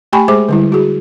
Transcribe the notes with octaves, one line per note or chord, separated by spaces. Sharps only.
A3 G4 G5 G#5 B5 C#6
G#3 G#4 C5 D6
D3 G3 E4
F#4 G#4